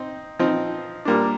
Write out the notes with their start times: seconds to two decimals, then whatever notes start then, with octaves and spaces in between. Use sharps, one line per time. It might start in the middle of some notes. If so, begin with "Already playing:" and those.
Already playing: C4 D#4
0.39 F3 C4 D#4
1.05 A#2 G3 A#3 D4